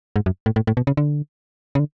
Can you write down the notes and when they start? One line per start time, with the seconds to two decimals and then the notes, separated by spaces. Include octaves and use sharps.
0.16 G#2
0.26 F#2
0.46 A2
0.56 A2
0.67 A2
0.77 B2
0.87 C#3
0.97 D3
1.75 C#3
1.79 D3